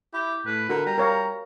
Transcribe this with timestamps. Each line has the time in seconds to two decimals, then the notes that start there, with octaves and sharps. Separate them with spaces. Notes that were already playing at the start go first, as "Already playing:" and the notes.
0.13 E4 G4
0.46 A2 B4
0.69 D3 F#4 A#4
0.86 G3 A#5
0.98 A#4 C#5 F5 A#5